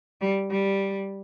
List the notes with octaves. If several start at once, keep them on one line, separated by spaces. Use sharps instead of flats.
G3
G3